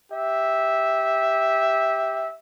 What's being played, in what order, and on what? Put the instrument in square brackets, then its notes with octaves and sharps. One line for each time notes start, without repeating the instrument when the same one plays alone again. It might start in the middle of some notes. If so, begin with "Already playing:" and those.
[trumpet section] G4 E5